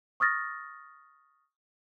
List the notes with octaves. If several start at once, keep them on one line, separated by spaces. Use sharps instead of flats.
C#6 D#6 F6 A6 A#6